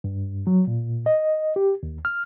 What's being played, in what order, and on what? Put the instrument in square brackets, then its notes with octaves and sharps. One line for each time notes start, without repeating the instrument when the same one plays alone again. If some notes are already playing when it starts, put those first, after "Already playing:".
[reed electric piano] G2
F#3
A#2
D#5
G4
D#2
F6